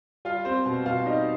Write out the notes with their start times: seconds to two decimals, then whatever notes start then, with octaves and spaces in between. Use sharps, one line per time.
0.25 G3 F4 F5
0.45 G3 C4 C5
0.66 B2
0.86 B2 F4 F5
1.06 G3 D#4 D#5